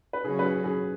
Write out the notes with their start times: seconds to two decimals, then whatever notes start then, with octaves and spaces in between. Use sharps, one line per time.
0.13 B4
0.25 C#3 F#3 C#4 F#4 G#4
0.39 B4
0.45 G#4
0.64 G#4